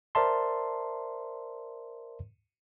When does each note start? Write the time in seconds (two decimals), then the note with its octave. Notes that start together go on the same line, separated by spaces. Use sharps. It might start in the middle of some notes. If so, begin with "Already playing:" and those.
0.15 A#4 C5 D5 E5 A5 C6